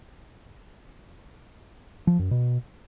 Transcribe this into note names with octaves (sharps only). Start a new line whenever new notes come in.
F3
F#2
B2